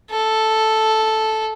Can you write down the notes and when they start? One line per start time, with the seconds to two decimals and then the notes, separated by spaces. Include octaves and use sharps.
0.11 A4